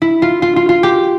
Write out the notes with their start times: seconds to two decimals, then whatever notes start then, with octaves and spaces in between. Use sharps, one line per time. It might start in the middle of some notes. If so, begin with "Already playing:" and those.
0.02 E4
0.22 F4
0.42 F4
0.56 F4
0.69 F4
0.83 G4